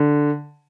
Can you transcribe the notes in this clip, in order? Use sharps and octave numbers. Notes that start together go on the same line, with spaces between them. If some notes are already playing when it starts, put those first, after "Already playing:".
Already playing: D3